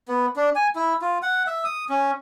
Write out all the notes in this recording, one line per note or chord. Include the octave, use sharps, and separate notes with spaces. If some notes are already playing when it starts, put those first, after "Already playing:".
B3
D4
G#5
E4
F4
F#5
E5
D#6
C#4